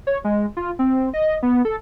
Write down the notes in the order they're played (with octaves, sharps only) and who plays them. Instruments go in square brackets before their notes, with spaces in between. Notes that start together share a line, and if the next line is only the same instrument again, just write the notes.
[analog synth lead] C#5
G#3
F4
C4
D#5
B3
A4